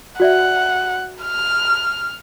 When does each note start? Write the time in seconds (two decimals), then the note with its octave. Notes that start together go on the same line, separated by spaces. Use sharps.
0.20 F#4 D5 E5 F#5
1.23 F6